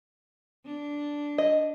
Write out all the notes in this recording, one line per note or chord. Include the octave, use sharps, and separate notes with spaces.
D4
D#5